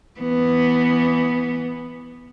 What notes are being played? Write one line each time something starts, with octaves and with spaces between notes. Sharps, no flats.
E3 B3